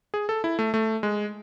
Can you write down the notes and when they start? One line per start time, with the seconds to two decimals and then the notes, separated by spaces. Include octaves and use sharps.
0.14 G#4
0.29 A4
0.44 E4
0.59 A3
0.74 A3
1.03 G#3